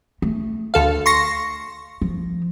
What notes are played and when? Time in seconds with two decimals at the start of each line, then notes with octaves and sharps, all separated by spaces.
0.22 A3
0.74 D2 A4 F5
1.06 C6 C#6 A#6
2.02 F3